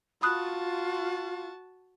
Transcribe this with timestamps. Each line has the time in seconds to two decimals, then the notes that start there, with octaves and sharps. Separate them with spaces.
0.22 F4 F#4 A5 B5 D#6 F#6